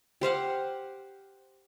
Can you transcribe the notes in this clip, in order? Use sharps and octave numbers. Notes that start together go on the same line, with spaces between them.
G4 C5 F5 F#5